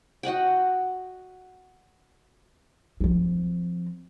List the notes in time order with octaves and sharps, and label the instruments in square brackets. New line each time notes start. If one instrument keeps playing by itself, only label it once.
[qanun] F#4 D#5 F#5 G5
[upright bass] F3 C4